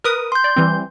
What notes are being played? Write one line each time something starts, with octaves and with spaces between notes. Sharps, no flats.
A#4 B4 D#6
C6 G6
D5
E3 G3 C4